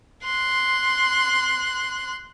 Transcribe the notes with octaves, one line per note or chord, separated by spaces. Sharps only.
C6 F#6